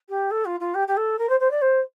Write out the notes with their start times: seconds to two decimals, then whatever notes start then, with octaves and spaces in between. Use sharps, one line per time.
0.09 G4
0.31 A4
0.45 F4
0.60 F4
0.74 G4
0.88 G4
0.97 A4
1.18 A#4
1.29 C5
1.40 C5
1.51 D5
1.62 C5